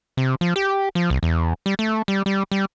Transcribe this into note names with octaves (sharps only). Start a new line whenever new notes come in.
C3
F3
G4
F3
C2
E2
G3
A3
G3
G3
G3